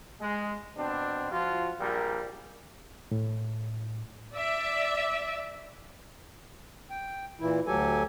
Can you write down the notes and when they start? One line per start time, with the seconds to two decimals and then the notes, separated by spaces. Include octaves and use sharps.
0.21 G#3
0.77 B2 C4 D4
1.30 F3 F4 F#4
1.79 A#1 G3 A#4
3.11 A2
4.32 D5 E5
6.91 G5
7.40 A#2 E3 E4
7.67 D2 F#3 G4 A4 G#5